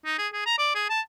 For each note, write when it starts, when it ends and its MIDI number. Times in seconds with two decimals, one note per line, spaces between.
0.05 0.16 63
0.18 0.28 68
0.33 0.43 68
0.46 0.57 82
0.58 0.72 74
0.75 0.86 68
0.90 1.01 81